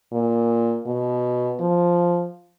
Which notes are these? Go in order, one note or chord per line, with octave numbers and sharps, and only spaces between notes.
A#2
B2
F3